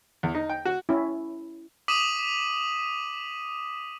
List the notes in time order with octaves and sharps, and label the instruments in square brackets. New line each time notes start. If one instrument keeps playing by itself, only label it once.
[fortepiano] E2
D#4
G5
F#4
[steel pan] C#4 E4
[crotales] D6 D#6 B6 D#7 E7 F#7